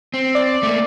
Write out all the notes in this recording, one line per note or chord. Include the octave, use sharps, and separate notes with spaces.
C4
D5
A3 A#3